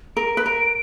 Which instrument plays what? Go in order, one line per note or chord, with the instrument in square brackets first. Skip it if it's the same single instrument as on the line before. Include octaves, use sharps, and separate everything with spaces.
[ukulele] A#4 [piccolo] D7
[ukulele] B4
A#4